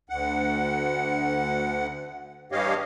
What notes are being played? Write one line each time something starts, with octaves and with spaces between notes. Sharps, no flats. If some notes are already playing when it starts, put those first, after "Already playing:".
D2 F#5
G2 E3 G4 C#5 D#5 F5